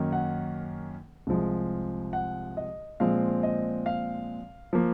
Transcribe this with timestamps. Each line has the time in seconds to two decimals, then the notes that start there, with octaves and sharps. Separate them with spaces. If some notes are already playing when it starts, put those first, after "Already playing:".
Already playing: F#2 D#3 A#3 C#4
0.12 F#5
1.27 C2 C3 F3 G#3
2.13 F#5
2.57 D#5
3.00 A#2 F3 G#3 C4 F5
3.43 D#5
3.86 F5
4.73 F3 A#3